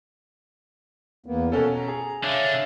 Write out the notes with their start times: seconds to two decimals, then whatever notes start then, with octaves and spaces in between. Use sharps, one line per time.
1.26 E2 A#3 B3
1.52 B2 C#4 A4 C#5 F#5
1.75 A#5
1.88 G#4
2.23 D3 C#5 E5 F5